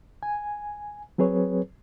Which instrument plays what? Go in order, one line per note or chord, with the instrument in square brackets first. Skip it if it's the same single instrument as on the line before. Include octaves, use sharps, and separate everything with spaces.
[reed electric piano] G#5
F#3 C4 G#4 B4 C#5